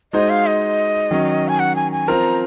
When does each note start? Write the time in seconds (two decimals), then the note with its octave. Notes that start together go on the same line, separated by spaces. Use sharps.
0.13 G#3 D#4 F#4 C5 D#5
0.29 F5
0.46 D#5
1.11 D#3 F#3 C#4
1.48 G#5
1.59 F#5
1.75 G#5
1.92 G#5
2.08 F3 C4 F4 A#4 A#5